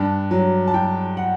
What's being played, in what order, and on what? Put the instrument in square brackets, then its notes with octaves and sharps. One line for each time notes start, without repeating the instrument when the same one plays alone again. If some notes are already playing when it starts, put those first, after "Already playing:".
Already playing: [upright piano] G2 A5
F#3
A5
F#3 G5
F#5